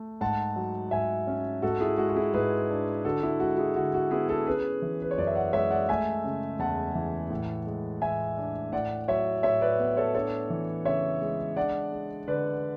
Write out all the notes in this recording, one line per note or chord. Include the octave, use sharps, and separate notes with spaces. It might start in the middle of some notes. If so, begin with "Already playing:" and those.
Already playing: A3
G#2 F#5 A5
F#3
G#2 E5 G#5
C#4
G#2 F#4 A4
E4 G#4
G#3 F#4
F#4
E4 G#4
G#2 G#4 B4
D4
D3 F#4 A4
E4
G#3 F#4
E4 G#4
D3 F#4
F#4
B3 E4 G#4
F#4 A4
C#4 G#4 B4
E3
B4
C#5
F#2 D5
E5
D5 F#5
G#3 C#5 E5
D5 F#5
A3 E5 G#5
C#3
E2 F#5 A5
E3
A2
G#3
A2 E5 G#5
D4
A2 D5 F#5
F#3 C#5 E5
A2 C#5 E5
B4 D5
B3
A4 C#5
D4 A4 C#5
E3
C#3 C#5 E5
G#3
D4 D5 F#5
G#3
D3 B4 D5